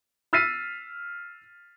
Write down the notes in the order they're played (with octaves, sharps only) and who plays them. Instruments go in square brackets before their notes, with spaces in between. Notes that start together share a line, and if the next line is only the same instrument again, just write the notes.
[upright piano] E6 F6 A6 B6 C7 D#7